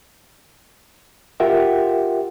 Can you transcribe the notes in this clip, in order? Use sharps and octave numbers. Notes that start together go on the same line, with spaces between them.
F4 G4 A#4 E5 F#5 G5